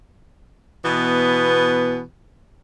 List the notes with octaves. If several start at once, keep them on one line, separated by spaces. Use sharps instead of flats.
B2 E3 B3